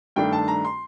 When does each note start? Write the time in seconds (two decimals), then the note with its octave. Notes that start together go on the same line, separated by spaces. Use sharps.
0.16 G2 D#3 A3 D4 G5
0.33 A5
0.48 A#5
0.65 C6